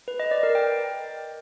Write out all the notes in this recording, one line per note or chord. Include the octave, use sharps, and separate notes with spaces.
B4
D#5
D5
A#4
G5